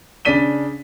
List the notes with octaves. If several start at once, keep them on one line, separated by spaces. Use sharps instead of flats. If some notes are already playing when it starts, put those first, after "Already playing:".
C#3 D4 D5 B6 D#7 G7